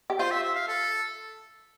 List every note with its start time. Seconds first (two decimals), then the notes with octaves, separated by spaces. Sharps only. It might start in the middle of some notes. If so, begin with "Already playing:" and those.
0.10 G4
0.19 F4 C5
0.31 E5
0.43 E5
0.55 F5
0.68 A4